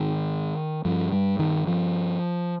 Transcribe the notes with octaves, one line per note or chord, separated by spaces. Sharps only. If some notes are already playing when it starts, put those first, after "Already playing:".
Already playing: G#2 D#3
G2 F3
G3
D#3
F3